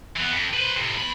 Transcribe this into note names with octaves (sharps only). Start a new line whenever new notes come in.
E3 B3
F2
B4 C5
A2 C3
E2 B5